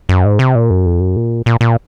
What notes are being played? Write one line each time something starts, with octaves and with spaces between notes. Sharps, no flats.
F#2
G#2
C3
A#2
F#2
F2
F#2
A#2
A#2
A#2